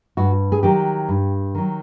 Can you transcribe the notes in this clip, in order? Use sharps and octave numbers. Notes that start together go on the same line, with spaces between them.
G2 F#4
G#4
D#3 F#3 G4
G2
D#3 F#3